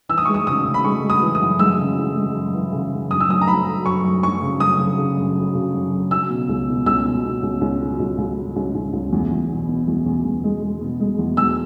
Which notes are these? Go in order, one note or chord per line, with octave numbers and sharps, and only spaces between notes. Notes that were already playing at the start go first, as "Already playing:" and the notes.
E3 E6
D#6
C#6
G#3
D#6
C#3 D#6
C#3
B5
G#3 C#6
G#3
D#6
E3
D#6
F#2
G#3 E6
C#3
E3
G#3
F#2
E3
C#3
F#2
F#2 D#6
E6
F#2 D#6
A#5
F#2 B5
F#3
F#2 C#6
F#2
F#2 C#6
C#3
F#2 D#6
C#3
C#3
F#2
F#3
C#3
F#2
C#3
F#3 E6
B2
C#2
B2
C#2 E6
B2
B2
C#2
C#2
F#3
C#2
C#2
F#3
C#2
C#2
C#2
E2
E2
B2
B2
E2
E2
E2
G#3
G#3
B2
G#3
E2
E2 E6